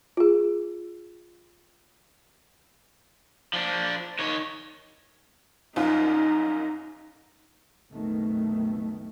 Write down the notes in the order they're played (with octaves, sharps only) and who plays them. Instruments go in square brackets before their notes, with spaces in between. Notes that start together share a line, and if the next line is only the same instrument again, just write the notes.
[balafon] F4 G#4
[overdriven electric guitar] F3 D4
D#3 C#5
[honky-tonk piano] C2 F#2 F4 [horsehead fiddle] D#4
[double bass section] F#1 C2 B2 D#3 A3